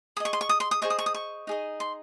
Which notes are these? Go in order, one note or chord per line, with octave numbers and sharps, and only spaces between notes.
G#4 D#5 C#6 D#6
C6
C#6
D#6
C6
D#6
G#4 C5 D#5 C#6
D#6
C#6
D#6
C#6
D#4 G#4 D#5
C6